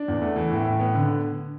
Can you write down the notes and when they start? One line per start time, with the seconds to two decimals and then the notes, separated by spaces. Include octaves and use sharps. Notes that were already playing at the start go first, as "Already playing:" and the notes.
Already playing: D4
0.08 E2
0.22 A3
0.36 E3
0.51 A2
0.65 A2
0.80 B3
0.95 D3